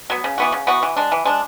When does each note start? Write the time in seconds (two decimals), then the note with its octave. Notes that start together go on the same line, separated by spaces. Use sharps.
0.10 F#3 B3
0.24 C#3
0.38 E3 B3 F#4
0.52 C#3
0.67 E3 B3 F#4
0.83 E3
0.96 G#3 D4
1.12 E3
1.25 G#3 D4